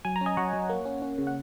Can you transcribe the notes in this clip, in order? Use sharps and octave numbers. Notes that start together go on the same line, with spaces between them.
F#3 G#5
A#5
C#4
D#5 G#5
F#3 C#5 F#5
F#3
A#3
C#4
C#4
C#3
F#5